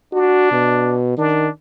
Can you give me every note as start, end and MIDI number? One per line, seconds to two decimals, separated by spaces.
0.13 0.99 62
0.13 0.50 66
0.52 1.13 47
1.18 1.48 51
1.18 1.50 62